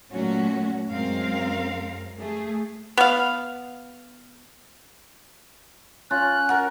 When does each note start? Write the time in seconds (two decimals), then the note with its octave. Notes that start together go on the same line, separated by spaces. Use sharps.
0.11 A#2 F#3 A3 C#4 F#4
0.90 F#2 G#3 C4 A#4 F5
2.18 A3 G#4
2.97 B3 F5
6.11 C#4 F4 F#6
6.49 F#4 A#4 F#5